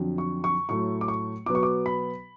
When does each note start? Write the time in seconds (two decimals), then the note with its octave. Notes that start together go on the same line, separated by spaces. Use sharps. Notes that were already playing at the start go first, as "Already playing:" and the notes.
Already playing: F2 D3 F#3
0.18 C#6
0.44 C#6
0.69 A2 F#3 A3 C#6
1.01 D6
1.08 C#6
1.46 B2 F#3 B3 D6
1.55 C#6
1.63 D6
1.86 B5